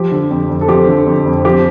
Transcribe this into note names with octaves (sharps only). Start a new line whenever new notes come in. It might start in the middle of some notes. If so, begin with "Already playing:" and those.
Already playing: F3 G4
D3
F2
F2
A4
F3 G4
D3
F2
F2
F3 G4